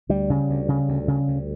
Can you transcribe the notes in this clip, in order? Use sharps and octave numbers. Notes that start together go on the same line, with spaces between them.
D2 G3
C#3
D2
C#3
D2
C#3
D2